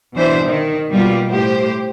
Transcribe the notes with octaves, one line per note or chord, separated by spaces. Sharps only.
B2 E3 D4 C5 E5
D#3
B2 G3 A#3 F4
A2 G4 C5